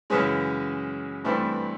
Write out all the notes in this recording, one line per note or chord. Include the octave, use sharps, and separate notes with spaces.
F#2 C#3 E3 G#3 C#4
G2 E3 A3 C4 E4